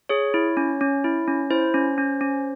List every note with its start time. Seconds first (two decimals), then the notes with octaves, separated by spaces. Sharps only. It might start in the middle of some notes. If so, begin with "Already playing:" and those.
0.09 G#4 C#5
0.34 E4
0.57 C#4
0.81 C#4
1.04 E4
1.28 C#4
1.50 E4 C5
1.74 C#4
1.98 C#4
2.21 C#4